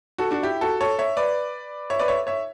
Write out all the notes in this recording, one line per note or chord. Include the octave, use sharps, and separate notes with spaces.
F#4 A4
D4 F#4
E4 G4
F#4 A4
A4 C#5
C#5 E5
B4 D5
C#5 E5
B4 D5
C#5 E5
C#5 E5